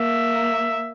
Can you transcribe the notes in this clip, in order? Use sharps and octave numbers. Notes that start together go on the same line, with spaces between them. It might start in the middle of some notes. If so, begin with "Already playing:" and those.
Already playing: A#3 E5